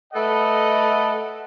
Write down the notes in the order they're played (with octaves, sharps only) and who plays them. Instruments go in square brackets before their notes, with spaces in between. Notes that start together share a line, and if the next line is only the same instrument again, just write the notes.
[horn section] A3 A4 B4 D#5 F#5